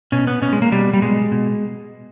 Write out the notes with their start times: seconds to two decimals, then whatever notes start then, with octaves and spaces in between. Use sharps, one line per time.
0.12 B2 C#4
0.27 B3
0.42 B2 C#4
0.53 G#3
0.62 A#3
0.72 B2 G3
0.94 G3
1.02 B2 G#3
1.32 B2